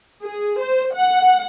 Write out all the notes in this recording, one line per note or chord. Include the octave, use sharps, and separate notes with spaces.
G#4
C5
F#5